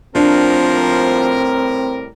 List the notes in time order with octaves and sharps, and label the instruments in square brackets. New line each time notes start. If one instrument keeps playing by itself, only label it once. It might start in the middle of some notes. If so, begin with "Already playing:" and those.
[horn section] A2 G3 A#4 [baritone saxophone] F3 [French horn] C4 [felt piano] D4